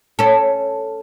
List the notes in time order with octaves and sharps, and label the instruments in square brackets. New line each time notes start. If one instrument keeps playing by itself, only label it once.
[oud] C#4 A4